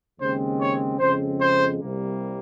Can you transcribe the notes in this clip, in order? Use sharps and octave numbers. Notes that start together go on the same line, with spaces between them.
D#2 C#3 G#3 C4 C5
C#5
F2 C#3 G#3 C4 C5
C5
C2 C3 G3 A#3